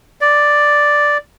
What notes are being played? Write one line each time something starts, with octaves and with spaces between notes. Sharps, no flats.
D5